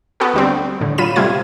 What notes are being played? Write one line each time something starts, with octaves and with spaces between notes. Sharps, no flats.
B3 F#4 A4
D2 G3 C4
A2 D3
F#3 F4 B5 D#7 E7
C3 G3 A3 F4 G#6